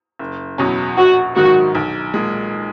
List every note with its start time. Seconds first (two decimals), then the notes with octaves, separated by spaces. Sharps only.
0.19 F#1
0.58 E2 B2 F#3 C#4
0.97 A#1 F#4
1.36 G#2 D#3 F#3 F#4
1.75 B1
2.14 A#2 G#3